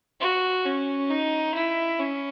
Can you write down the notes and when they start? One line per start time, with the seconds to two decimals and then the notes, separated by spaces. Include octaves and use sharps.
0.20 F#4
0.66 C#4
1.10 D#4
1.55 E4
2.00 C#4